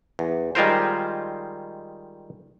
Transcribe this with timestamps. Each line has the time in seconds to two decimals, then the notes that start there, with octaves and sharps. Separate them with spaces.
0.19 E2
0.55 D#3 G3 G#3 F4 A#4 C5